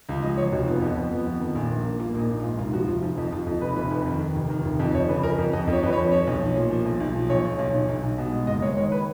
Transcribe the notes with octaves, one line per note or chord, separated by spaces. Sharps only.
C#2
F3 D#5
F3 C#5
F1 F#4
B3 F4
F2
F2
B3
F2
D#3
A#1
A#3
A#3
A#3 F4
A#1
D#4
A#1
F4
G#2
F1 F4
F3 F#4
F1 F4
F3 F4
F2 D#4
F2 F4
F2 D#4
F1 B4
F1 B4
F2
D#3
D#3
F1
D#3
F1
F2
F2 C#5
C#3 B4
F2 A#4
F2
F2 D#5
F2
C#5
F2 B4
C#5
F2
F3 C#5
B1
F3
A#2
F3
B1
B1
F3
B1 C#5
B1
B1
B1
B1
B1
B2
G#3
F#1 D#5
G#3 C#5
D#3 C#5
B4